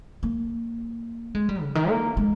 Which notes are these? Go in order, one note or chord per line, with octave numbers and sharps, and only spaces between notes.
A#3
G#3
G3
C#3
D#3
A#3
G#3